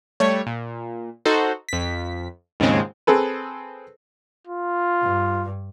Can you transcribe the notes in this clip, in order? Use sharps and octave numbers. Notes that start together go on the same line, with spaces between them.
G3 A3 C#5
A#2
D#4 F#4 A4 C5
F2 B6
D#2 G#2 C#3 F3 G#3 C4
C4 G#4 A4 B4
F4
G2